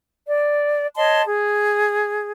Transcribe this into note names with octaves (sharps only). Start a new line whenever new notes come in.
D5
C#5 D#5 A5 C6
G#4